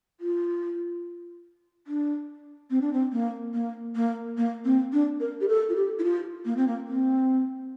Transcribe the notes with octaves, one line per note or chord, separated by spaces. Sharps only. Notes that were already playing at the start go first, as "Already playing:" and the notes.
F4
D4
C4
D4
C4
A#3
A#3
A#3
A#3
C4
D4
A#4
G4
A4
F4
G4
E4
F4
A#3
C4
A#3
C4